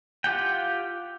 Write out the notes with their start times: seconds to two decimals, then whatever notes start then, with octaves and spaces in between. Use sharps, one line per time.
0.24 F4 G4 F#5 G5